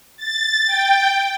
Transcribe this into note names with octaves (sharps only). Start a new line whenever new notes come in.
A6
G5